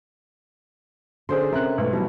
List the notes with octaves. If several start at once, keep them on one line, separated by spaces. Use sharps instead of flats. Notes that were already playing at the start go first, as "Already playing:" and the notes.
D3 C#4 G#4 C5 D5 C6
C3 C4 C#4 A#4 F#6
B1 G#2 A3
B2 E3 F#3 G3